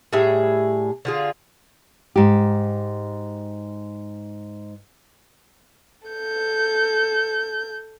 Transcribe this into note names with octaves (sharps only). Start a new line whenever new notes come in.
A2 G3 G#4 E5
D3 F4 G#4
G#2 G4
A4 G6